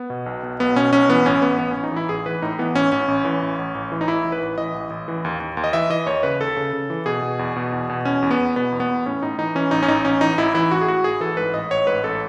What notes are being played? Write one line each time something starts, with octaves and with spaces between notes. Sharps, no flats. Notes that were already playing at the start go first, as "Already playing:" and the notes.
Already playing: B3
B2
B1
B2
B1 B3
B2 C#4
B1 C#4
E3 B3
A1 C#4
A1 B3
A1 B3
A1 C#4
D#4
E3 E4
A1 G#4
E3 B4
A2 D#4
E3 B3
A1 C#4
A1 C#4
A1
E3
A1
A1
A1
E3
D#4
A1 E4
E3
B4
A1
E3 D#5
A1
A1
E3
D#2
D#2
D#2
D#5
E3 E5
E3 D#5
D#2 C#5
C#3 B4
D#2 A4
C#3
C#3
E3
B2 G#4
B2
E2
B2
E2
B2
E2 C#4
E2
B3
E2
B2 B3
E2
B3
E2
A2 C#4
A2 D#4
E3 D#4
E3 C#4
A1 D#4
C#4
A1 D#4
A1 C#4
E3 D#4
A1 E4
E3 E4
A1 F#4
G#4
A2 F#4
A1 G#4
E3 A4
G#2 B4
A1 D#5
A1 C#5
G#2 B4
A1 A4